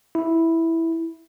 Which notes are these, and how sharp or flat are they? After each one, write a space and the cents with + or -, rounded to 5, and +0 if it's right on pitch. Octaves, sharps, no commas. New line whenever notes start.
E4 -5